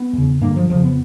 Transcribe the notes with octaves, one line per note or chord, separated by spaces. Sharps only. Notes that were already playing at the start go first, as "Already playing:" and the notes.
Already playing: B3
E2 C#3
G2 D3 A#3
F3
F2 C#3 F3
B3